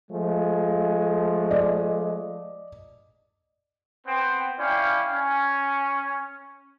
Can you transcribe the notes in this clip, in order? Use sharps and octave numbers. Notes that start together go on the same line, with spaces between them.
F3 G#3 A3
D5 D#5
B3 C4 C5 G5
C#4 E4 D5 F5 G5
C#4